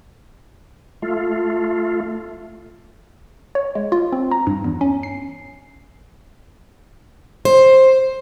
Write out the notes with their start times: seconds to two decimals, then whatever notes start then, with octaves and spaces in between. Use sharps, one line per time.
1.02 A3 F4
3.55 C#5
3.75 G#3
3.92 F4
4.12 C4
4.31 A#5
4.47 G2
4.64 E2
4.81 C#4
5.03 C7
7.45 C5